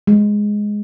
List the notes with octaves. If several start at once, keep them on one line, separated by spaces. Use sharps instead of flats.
G#3